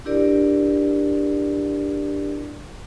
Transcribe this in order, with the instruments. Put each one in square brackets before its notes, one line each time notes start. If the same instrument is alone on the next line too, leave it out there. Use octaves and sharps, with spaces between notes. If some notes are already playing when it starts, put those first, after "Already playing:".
[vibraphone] D4 E4 G4 A#4 D5